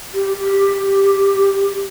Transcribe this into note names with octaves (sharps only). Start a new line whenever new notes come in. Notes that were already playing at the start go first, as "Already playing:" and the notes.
G4
G4